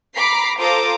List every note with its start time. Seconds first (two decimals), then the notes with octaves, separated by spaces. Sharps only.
0.15 A#5 B5 D6 B6 C7
0.59 F4 A4 C5 A#5 D6 D#6